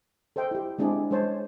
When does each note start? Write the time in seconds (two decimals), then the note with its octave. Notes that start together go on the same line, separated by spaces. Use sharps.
0.36 A4 C5 D#5 G5
0.51 E4 G4
0.79 G#3 C4 D4 E4 G#4
1.11 G#3 C#4 C5 C#5 A5